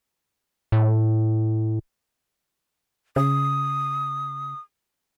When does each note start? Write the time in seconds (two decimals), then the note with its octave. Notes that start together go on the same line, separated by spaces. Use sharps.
0.72 A2
3.16 C#3 D#6